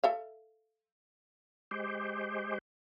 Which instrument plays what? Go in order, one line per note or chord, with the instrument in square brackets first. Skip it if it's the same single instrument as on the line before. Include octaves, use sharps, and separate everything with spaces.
[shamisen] A4 E5 F5
[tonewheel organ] G#3 G4 C5